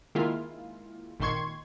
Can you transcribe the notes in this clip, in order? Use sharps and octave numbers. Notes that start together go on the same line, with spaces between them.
D#3 G#3 A#3 E4 F4
G#1 A#2 D#3 C6 C#6 G#6